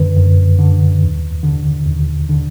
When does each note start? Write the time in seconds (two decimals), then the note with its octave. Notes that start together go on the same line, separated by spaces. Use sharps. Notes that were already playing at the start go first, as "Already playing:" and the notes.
Already playing: F#2 D3 B4
0.17 F#2
0.59 D3
1.02 D#2
1.43 D3
1.86 D#2
2.29 D3